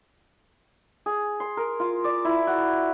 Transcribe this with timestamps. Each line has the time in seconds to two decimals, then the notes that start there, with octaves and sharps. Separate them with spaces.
1.06 G#4
1.40 C6
1.57 A#4
1.80 F4
2.04 D5
2.25 E4
2.47 F#4